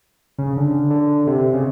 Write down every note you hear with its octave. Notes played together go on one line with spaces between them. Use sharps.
C#3
D3
D3
C3
C#3